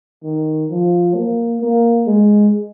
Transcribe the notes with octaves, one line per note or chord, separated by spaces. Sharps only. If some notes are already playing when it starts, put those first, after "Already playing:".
D#3
F3
A#3
A#3
G#3